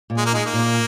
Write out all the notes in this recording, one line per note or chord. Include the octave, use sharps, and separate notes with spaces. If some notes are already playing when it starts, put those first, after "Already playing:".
A#2
G#3
A#3
G#3 D#4
A#3
A#2